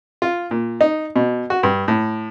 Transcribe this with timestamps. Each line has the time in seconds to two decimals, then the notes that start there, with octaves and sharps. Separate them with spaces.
0.22 F4
0.51 A#2
0.81 D#4
1.16 B2
1.50 F#4
1.63 G2
1.88 A2